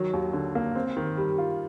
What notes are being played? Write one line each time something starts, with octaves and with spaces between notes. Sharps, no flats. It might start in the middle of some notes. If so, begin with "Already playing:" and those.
Already playing: D#3 F#3
D#2
D3
A#3
C4
D#3
G3
F4